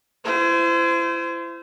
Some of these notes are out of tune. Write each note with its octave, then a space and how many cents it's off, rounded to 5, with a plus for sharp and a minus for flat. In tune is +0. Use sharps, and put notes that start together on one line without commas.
E4 +35 C5 -25